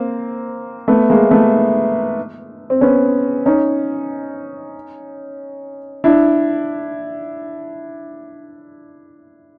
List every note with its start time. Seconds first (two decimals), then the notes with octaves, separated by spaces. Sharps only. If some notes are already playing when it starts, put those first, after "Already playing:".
Already playing: A#3 C4
0.88 A3 B3
1.10 G#3 A#3
1.31 A3 B3
2.70 C4
2.81 B3 C#4
3.46 C#4 D#4
6.04 D4 E4